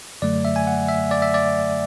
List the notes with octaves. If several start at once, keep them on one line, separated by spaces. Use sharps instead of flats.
F#2 D3 F#3 A3 D5
E5
G#5
F#5
E5
D5
E5
D5